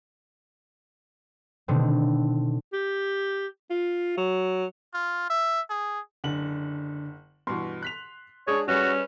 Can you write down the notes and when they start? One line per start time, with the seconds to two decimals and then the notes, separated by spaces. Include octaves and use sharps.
1.68 B2 D3 D#3 A3 C4
2.73 G4
3.70 F4
4.17 F#3
4.94 F4
5.30 E5
5.70 G#4
6.24 F#1 D3 F#7
7.47 G2 B2 E3 C6
7.83 F#6 B6 F7
8.47 G#3 D4 G#4 C#5
8.68 G3 C#4 F#4 G#4 B4